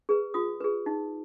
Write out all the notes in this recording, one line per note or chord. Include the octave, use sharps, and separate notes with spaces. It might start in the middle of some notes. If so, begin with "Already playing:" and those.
G#4 B4
F4 D#6
G#4 B4
D#4